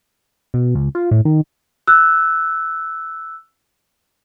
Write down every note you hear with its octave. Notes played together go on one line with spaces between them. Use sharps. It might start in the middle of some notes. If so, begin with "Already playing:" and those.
B2
C#2
F4
A2
D#3
E6 F#6